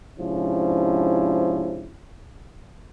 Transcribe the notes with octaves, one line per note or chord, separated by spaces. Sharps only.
G#2 C3 F3 C#4 D4 E4